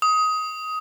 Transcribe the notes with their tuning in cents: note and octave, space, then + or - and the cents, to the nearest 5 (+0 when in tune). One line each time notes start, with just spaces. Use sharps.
D#6 +15